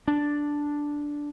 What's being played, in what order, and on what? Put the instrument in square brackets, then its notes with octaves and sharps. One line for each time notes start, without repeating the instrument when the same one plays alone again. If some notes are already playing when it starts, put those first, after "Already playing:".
[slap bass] D4